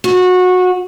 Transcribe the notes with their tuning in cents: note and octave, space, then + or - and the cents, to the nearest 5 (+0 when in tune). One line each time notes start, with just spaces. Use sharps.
F#4 -20